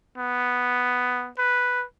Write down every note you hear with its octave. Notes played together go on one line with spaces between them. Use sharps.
B3
B4